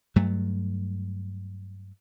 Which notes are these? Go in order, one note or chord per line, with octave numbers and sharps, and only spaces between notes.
G2 F#3 A3